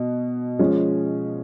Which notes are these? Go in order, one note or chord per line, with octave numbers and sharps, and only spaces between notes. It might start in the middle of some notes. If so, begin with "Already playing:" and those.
Already playing: B2
F3 G#3 C#4